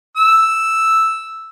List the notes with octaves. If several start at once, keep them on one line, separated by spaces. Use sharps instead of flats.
E6